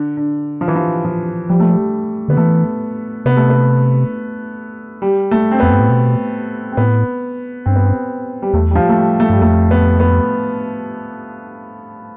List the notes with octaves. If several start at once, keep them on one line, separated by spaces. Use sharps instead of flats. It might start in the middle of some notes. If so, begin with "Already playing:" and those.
Already playing: D3
D3
F3
E3
F3
F3
F3 G3
A3
G3
D3 B3
E3 A3
C3 B3
A3
B3
G3
A3
C4
F2 B3
G2
A2
B2
C4
A2 B3
G2 C4
B3
C4
G3
E2 A3
G3
F3
A3
G3
A3
G2 G3
F2 A3
B3
B3